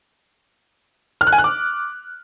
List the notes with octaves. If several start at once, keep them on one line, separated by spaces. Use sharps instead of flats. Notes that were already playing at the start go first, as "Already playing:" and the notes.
F6
F#6
G#5
F#6
D6